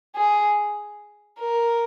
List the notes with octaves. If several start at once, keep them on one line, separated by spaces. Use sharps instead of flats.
G#4
A#4